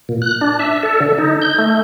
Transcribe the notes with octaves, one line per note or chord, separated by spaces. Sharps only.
A#2
F#6
D4
E5
A4
D3
D#4
G6
A3